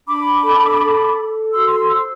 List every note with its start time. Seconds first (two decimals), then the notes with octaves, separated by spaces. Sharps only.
0.07 D4 B5 D6
0.43 A4
0.81 A4
1.17 A4
1.53 F#4 C6 E6
1.70 C6 E6
1.88 C5 C6 E6